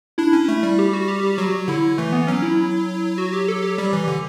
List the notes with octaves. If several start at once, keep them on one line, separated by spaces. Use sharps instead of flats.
D4 E4
C#4
A3
G3
G4
F#4
G4
G4
F#3 F#4
D3 E4
E3 A3
B3
F#3 C#4
E4
F#4
G4
A4
G4
G3
E3
D3